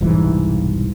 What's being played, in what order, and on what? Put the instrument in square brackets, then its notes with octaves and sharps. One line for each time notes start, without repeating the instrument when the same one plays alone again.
[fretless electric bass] E1 C2 G#2 E3